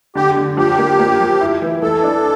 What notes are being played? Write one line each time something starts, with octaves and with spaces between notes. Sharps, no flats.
D3 G4
D3
F3 G4
A#3
A#3
F3
E4
E3
E3 A4
D4